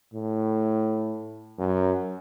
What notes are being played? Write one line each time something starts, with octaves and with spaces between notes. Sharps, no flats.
A2
F#2